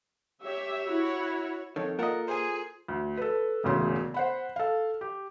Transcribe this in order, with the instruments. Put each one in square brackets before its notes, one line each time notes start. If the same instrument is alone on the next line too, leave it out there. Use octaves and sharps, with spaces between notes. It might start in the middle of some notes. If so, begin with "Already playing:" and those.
[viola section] G4 E5 [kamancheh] C#5
[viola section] E4 F#4
[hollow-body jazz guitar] F2 D#3 [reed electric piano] A4 C#5
[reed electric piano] A#3 [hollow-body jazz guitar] F4 A4 A#4 [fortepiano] D#5 F#5
[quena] G#4 [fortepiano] C5 G#5
[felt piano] D2
A4 B4
E1 A1 D2 C#3 C6
C5 F#5 B5
A4 F5
G4